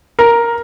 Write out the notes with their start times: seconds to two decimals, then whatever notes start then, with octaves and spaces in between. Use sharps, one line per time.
0.19 A#4